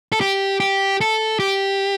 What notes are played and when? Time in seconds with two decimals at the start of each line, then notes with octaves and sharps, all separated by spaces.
0.12 A4
0.21 G4
0.60 G4
1.01 A4
1.40 G4